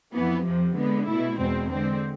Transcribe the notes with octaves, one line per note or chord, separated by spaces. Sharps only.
F2 E3 B3
F2 C3 F3
D3 G#3 B3
B2 A3 E4
E2 B2 G#3 C4
D3 G#3 C4